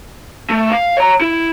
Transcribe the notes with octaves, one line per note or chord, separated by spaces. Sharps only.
A3
F5
C#5 A#5
E4